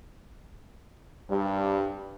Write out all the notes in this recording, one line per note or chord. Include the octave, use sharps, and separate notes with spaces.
G2 G3